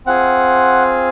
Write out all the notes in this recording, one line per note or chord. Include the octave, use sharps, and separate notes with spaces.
C4 F4 G#4 F#5